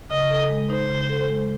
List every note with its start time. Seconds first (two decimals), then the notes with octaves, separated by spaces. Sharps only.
0.10 C#3 D#5
0.30 A4
0.50 G#3
0.70 D#4 C5
0.90 C#3
1.09 A4
1.30 G#3